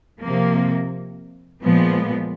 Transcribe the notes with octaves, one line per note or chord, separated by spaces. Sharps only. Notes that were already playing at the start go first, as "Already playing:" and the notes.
C3 F3 A#3
A#2 F3 G#3 B3